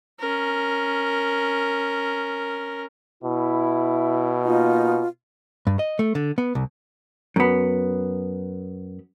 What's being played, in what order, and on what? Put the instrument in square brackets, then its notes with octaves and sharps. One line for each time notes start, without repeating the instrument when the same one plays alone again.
[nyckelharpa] C#4 A#4
[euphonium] B2 [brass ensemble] E4
[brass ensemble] A#3 D#4 [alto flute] F4
[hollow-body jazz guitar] G2
D#5
A3
D3
B3
C2
F#2 B3